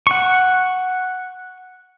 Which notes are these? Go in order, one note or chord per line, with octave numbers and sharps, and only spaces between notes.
F#5 C#6